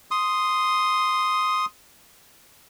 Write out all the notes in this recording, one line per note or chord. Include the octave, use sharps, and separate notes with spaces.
C6 D#6